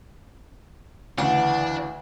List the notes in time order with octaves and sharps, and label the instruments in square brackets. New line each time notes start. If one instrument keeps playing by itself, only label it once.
[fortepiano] D2 C#3 [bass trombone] E3 [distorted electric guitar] D4 [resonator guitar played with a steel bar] F#5